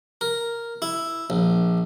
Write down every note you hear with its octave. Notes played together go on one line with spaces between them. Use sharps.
A#4
E4
A#1